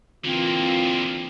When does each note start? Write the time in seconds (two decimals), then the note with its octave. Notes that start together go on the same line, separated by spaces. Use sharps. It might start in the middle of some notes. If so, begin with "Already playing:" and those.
0.25 D3 E3 A#3 C4 F4